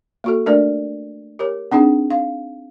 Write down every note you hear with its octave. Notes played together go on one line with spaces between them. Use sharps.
A#3 F#4 A4
A3 D4 A#4 D5
G4 A#4 C#5
C4 D4 D#4 G#4
F5